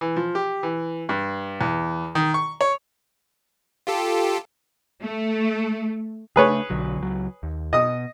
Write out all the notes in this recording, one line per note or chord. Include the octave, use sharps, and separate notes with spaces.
E3
F3
G4
E3
G2
E2
D#3
C#6
C#5
F4 G4 A4
A3
C#3 A3 D4 G#4 B4 C#5
B1 D3 F#3
C#2 F#3
D#2
B2 D#5 D#6